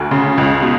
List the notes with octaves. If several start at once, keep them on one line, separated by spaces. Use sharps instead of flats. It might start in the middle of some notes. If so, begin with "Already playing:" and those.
Already playing: D2
C#3
C#2
B2